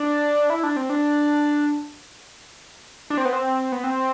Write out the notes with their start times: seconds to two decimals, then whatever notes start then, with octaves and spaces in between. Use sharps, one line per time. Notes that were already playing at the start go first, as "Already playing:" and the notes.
Already playing: D4
0.50 E4
0.63 D4
0.76 C4
0.90 D4
3.10 D4
3.18 C4
3.25 B3
3.33 C4
3.72 B3
3.84 C4